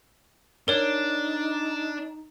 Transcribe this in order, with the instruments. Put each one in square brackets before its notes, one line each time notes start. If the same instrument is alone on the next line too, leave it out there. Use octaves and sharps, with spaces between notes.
[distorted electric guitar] D4 [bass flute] D#4 [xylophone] A#4 C#5